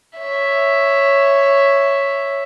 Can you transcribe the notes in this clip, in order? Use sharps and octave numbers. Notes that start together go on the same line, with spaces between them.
C#5 E5